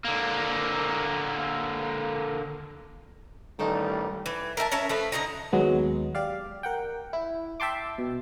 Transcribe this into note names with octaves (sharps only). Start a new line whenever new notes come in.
D3 A#3
A1 D#3 G3 A3 D#4
E3
A#4 E5 G5 A5
C#4 A#4 E5 A5
F3 A3 B4
D3 D#4 F#4 A#5
D#2 F#3 G#3 B3
G4 D5 F5
A#4 F#5 G5
E4
E5 G5 A5 C6 D6
B2